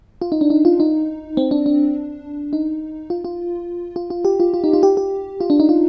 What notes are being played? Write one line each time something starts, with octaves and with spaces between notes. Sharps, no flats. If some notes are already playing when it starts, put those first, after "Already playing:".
F4
D#4
D4
D#4
F4
D#4
C4
D4
D4
D#4
F4
F4
F4
F4
G4
F4
F4
D#4
F4
G4
G4
F4
D4
D#4
F4